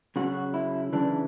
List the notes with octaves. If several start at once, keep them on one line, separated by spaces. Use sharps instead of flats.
C#3 F#3 F#4
E4
C#3 E3 D4